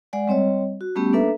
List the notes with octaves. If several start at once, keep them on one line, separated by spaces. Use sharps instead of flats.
G#3 D5 F#5 G#5
G3 C4 C#5 D#5
F#4
G3 A3 B3 C#4 G4
A#3 D4 A4 B4 E5